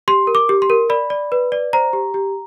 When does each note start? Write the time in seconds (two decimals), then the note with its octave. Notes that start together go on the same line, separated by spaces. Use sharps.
0.08 G4 C6
0.27 A#4
0.35 D6
0.49 G4
0.62 C6
0.70 A#4
0.90 D5 B5
1.10 D5
1.32 B4
1.52 D5
1.73 C5 A#5
1.93 G4
2.14 G4